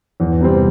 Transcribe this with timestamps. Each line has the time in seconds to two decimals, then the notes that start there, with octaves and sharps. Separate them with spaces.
0.20 E2
0.40 C3 G3 C4